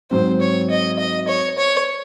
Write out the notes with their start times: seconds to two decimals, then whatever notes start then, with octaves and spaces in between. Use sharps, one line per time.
0.11 G#2 F#3 C4 C5
0.41 C#5
0.70 D#5
0.99 D#5
1.28 C#5
1.58 C#5